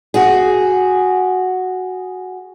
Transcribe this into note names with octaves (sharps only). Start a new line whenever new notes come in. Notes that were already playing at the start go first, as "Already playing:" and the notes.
F#4 G#4